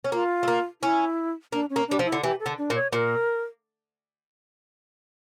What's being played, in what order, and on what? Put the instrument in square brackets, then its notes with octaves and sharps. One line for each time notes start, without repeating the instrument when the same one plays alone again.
[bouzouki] C#4
[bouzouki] A#3 [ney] F4
[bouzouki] A3
A#3
[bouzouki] C#4 [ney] E4
[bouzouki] A#3 [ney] D4
[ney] C#4
[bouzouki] A#3
[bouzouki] G3 [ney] D4
[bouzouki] F3
[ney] E4
[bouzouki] D3
[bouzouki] E3 [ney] G4
[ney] A4
[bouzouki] D3
[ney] D4
[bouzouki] A#2
[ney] C#5
[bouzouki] A#2 [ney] A#4